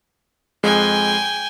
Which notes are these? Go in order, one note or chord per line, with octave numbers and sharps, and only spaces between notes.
F2 G#3 G5 G#5